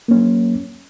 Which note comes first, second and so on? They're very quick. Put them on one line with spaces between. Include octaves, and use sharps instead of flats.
A#3 C#4 F#3